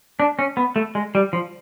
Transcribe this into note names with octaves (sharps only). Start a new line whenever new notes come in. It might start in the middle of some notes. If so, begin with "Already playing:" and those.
D4
C#4
B3
A3
G#3
G3
F3